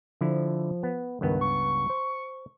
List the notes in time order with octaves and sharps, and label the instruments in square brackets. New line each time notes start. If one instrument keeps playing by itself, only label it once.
[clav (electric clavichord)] D3 E4 [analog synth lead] F3
[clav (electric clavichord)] B3
[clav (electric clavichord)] C#2 G2 B3 [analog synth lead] D#3
[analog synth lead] C#6
[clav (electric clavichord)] C5